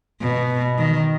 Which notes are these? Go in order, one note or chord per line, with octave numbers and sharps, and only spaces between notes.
B2
D#3